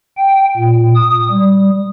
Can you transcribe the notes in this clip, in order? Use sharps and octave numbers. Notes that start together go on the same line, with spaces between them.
G5
A#2
D#6
G3